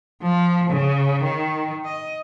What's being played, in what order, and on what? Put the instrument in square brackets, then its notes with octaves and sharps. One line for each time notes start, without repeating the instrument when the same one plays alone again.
[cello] F3
C#3
D#3
D#5